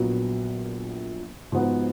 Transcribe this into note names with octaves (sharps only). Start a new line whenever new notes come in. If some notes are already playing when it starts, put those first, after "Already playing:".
Already playing: A#1 A#2 F#3 B3
G#2 F3 B3 F#4